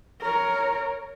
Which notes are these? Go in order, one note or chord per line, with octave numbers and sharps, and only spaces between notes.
A#4 C#5